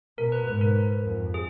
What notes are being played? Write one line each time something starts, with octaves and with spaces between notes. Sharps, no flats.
B2 A#4
B4
G#2 B4
A#4
F2
G#4